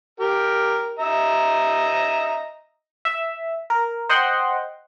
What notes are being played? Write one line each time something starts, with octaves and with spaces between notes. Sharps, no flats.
G4 A#4
D#5 E5 A#5
E5
A#4
C5 D#5 F#5 G5 C6